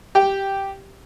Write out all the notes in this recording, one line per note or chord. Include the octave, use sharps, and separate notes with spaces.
G4 G5